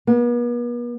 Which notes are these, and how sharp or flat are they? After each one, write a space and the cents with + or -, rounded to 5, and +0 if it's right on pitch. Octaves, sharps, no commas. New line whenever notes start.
B3 -45